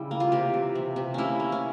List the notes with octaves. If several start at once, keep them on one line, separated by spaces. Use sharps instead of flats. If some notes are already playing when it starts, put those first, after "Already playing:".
Already playing: C#3 G3 E4
A#3
F4
C3 G4
E3
C3
C3
A#3 C#4 E4
A#3
C#4